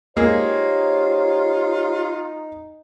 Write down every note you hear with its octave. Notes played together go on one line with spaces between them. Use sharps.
G#3 A#3 D#4 F4 G4 G#4 C5 C#5